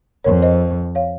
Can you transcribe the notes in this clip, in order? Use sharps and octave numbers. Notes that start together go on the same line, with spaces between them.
F2 A#4 C#5
C5 D#5
C#5 F5